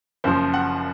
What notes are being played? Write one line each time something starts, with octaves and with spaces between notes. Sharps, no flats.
F#1 F#2 F3 C5
F#5